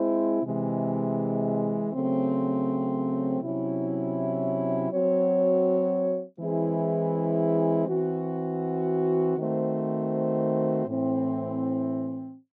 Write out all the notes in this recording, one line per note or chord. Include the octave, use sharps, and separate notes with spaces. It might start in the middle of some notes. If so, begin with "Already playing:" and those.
Already playing: G#3 C4 E4 C5
C3 E3 G#3
C#3 F#3 A3 C4
C3 F#3 C#4 E4
F#3 C4 F#4 C#5
E3 G#3 C4 E4 G#4
E3 C4 F#4
D#3 A3 C4 F#4 C5
A2 E3 C4